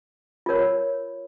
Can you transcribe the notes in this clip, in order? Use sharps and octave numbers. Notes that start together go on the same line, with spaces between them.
F4 A#4 C#5